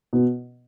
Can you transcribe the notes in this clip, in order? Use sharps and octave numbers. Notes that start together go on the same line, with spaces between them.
B2